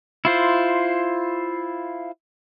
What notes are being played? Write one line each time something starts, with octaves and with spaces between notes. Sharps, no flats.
E4 F4 C5